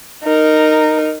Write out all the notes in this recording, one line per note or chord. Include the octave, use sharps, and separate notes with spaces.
D#4 A#4